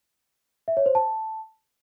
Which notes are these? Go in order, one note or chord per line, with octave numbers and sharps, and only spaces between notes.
E5
C#5
C5
A5